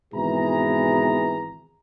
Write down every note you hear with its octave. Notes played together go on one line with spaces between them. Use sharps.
G#1 B2 E3 G#4 A#5